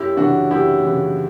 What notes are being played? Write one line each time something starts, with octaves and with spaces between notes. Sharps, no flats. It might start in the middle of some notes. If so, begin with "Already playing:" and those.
Already playing: F#2 E4 G4
C#3 E3 D4 F#4
F#2 E4 G4
C#3 E3